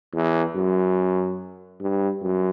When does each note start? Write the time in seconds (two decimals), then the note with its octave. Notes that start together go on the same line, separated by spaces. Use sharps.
0.14 E2
0.56 F#2
1.80 G2
2.22 F#2